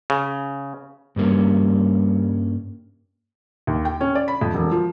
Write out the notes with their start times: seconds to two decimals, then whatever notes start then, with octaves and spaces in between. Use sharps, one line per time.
0.10 C#3
1.16 G2 G3 A#3 C#4
3.67 D#2
3.85 G5
4.01 C#4
4.15 D5
4.28 B5
4.41 F2
4.54 E1
4.71 F3